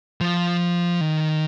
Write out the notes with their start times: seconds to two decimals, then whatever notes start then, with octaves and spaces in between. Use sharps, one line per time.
0.21 F3
1.01 D#3